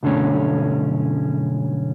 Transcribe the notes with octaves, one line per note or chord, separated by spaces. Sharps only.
B1 G2 D3 A3 C#4